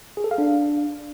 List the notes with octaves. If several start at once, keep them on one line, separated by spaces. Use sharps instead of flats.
G#4
A4
F5
D4